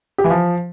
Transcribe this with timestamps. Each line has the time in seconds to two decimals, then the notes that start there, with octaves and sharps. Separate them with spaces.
0.18 G4
0.24 E3
0.30 F3